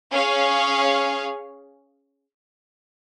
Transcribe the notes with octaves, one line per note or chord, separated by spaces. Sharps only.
C#4 G#4 C#5 F5